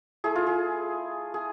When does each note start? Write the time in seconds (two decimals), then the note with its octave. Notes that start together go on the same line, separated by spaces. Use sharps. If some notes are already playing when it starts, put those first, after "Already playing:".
0.24 A3 E4 G#4
0.35 F4
0.47 G#4
1.34 G#4